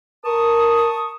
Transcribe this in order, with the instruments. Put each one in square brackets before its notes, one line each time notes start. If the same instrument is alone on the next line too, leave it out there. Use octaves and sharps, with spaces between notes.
[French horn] A#4 [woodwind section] A5 C#6 D#6